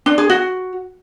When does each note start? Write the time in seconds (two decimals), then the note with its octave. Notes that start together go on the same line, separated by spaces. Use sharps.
0.06 D4
0.18 G#4
0.30 F#4